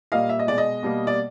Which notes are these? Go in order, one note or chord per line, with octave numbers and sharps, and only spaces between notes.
A#2 G3 A#3 D#5 F5
E5
D#5
B2 G#3 D5
D#5
B2 G3 A#3
D5